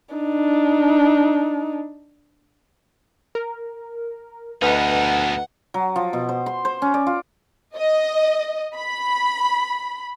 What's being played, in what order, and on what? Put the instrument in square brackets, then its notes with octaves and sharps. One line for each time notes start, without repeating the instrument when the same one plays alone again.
[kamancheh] D4 D#4
[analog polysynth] A#4
[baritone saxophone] D2 [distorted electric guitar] B3 D#4 [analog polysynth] B4 D#5 [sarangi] F#5
[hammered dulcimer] F#3
F3
B2
C5
C6
C5
C#4
D5
F4
[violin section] D#5
B5